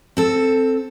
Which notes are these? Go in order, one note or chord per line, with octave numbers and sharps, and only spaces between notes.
C4 A4